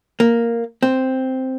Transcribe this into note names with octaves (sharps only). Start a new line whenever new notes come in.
A#3
C4